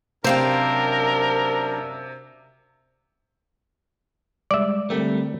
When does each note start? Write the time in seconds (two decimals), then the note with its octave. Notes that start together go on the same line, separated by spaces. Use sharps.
0.24 F#2 C3 D4 A#4 C5 F5 G5
4.51 G3 G#3 D5 E5
4.90 D3 G3 A3 C4 A#4